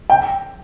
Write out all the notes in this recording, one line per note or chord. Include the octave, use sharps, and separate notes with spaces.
G5